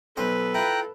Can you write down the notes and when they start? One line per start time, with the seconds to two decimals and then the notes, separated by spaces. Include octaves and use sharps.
0.17 B1 A4 B4 C5 D#5
0.54 E4 F4 G5 A#5 F#6